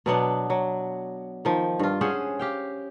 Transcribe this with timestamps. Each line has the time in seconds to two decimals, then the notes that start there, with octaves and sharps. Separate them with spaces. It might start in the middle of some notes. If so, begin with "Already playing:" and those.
0.06 B2 F#3 B3 D4
0.50 F#3
1.45 D#3 F3
1.79 G2 F4
2.01 C#4 G#4 C5 F#5
2.39 G4 F5 G5